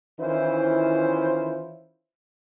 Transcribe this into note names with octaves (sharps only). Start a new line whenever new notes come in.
D#3 E3 C#4 E4 F4 C5